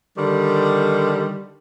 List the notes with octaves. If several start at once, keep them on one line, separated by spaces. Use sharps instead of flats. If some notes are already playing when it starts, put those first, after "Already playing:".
D3 D#3 G3